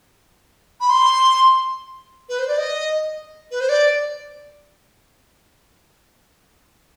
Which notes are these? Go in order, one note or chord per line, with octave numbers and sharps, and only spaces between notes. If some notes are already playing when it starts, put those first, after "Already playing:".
B5
C6
B4
C5
D5
D#5
B4
C5
D5